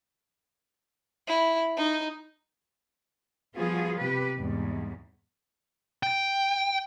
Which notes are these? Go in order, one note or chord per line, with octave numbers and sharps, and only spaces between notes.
E4
D#4
F3 G3 B3 F4 F#4 G#4
C3 G4 B4
E2 G#2 G3
G5